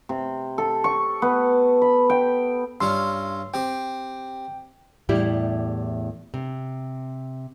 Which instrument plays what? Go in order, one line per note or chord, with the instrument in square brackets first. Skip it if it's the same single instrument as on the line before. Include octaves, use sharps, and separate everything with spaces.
[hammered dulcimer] C3
A4
C#6
B3
B5
G5
[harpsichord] G2 C#4 F4 [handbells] C6 E6
[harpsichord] C4 G4 [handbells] G5
[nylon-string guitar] E2 A2 G3 E4 G4
C3